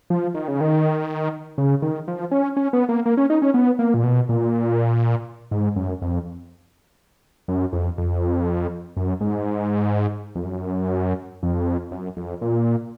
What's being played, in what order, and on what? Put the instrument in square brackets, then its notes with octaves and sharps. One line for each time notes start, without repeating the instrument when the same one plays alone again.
[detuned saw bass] F3
D#3
C#3
D#3
C#3
D#3
F3
C#4
C#4
B3
A#3
A#3
C#4
D#4
C#4
B3
A#3
A#2
B2
A#2
G#2
F#2
F2
F#2
F2
F2
F#2
G#2
F2
F#2
F2
F#2
F2
A#2